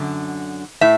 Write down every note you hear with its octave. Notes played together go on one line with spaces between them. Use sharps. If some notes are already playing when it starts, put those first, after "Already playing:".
Already playing: F#2 D3
A2 E5